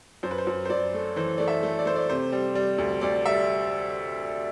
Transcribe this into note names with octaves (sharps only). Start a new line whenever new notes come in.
F#2 C5
B4
C5
F#2
C5
F#2 D5
A3
E3 C5
A3 D5
E5
A3
D5
A3 C5
D5
C3 C5
G3
G3
D2
D2 D5
G3 E5